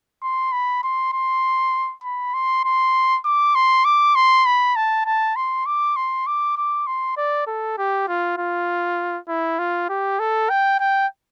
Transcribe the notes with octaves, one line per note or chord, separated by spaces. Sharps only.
C6
B5
C6
C6
B5
C6
C6
D6
C6
D6
C6
B5
A5
A5
C6
D6
C6
D6
D6
C6
D5
A4
G4
F4
F4
E4
F4
G4
A4
G5
G5